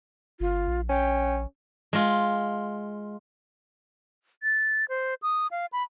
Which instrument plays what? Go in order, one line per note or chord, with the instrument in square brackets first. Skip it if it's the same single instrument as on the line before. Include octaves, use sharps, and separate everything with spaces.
[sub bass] G1 [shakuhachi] F4
[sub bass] A#1
[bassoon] C#4 [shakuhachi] G5
[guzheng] G#3 F4
[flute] A6
C5
D#6
F5
B5